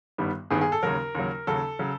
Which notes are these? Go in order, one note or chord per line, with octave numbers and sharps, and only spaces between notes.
G1 G2 D#3 G3 B3
G1 G2 D#3 G3 B3 G#4
G#4
A4
D#2 C#3 F#3 A#4
D#2 C#3 F#3
D#2 C#3 F#3 A4
C#3 F#3